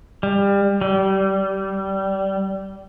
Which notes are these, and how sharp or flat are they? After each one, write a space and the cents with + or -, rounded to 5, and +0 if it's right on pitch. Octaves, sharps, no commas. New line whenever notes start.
G3 +25
G3 -20